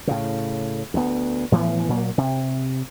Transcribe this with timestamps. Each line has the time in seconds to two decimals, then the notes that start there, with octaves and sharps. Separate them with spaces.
0.07 A2 C#3
0.94 D2 B3
1.52 A2 E3 F3 B3
1.89 A#2 F#3 A#3
2.18 C3